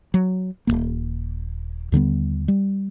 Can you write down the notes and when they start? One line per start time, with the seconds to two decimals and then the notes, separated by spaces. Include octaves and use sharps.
0.14 F#3
0.67 D#1 F2 A#3
1.92 D#2 D3 G3 B3
2.48 G3